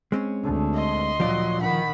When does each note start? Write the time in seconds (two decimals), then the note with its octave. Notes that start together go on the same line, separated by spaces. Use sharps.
0.12 G#3 C4 C#4
0.44 D2
0.75 D#5 C6
1.20 A#2 F3 F#3 F4 D5
1.62 D#3 F#5 B5